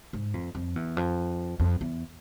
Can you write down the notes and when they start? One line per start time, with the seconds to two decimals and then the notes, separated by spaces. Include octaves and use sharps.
0.13 G#2
0.34 F2
0.55 F2
0.76 E2
0.97 F2
1.60 F2
1.81 E2